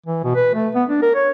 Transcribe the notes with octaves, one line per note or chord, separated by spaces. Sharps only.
E3
B2
B4
A3
B3
D4
A#4
C#5